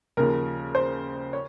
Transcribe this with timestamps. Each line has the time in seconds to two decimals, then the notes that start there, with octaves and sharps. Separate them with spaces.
0.17 D#2 C#3 F3 A#4
0.75 C5
1.33 C#5